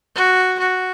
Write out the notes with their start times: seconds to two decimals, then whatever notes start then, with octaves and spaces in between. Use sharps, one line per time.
0.16 F#4
0.59 F#4